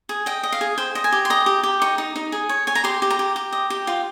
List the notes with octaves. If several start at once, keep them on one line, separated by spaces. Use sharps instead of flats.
G#4
D#5 G5
D#5
F5
G#4
C5 G5
D#5
G#5
G4
C6
D#5 A#5
G4
G4
D#4 C#6
D#4
D#4
G#4
C#5
C#5 G#5
A#5
G4 C6
G4
A#5
G4
G4
D#5
G4
F4